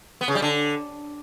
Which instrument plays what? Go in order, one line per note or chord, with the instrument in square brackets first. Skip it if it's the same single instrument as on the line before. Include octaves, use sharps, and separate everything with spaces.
[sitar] B3
C#3
G3
D3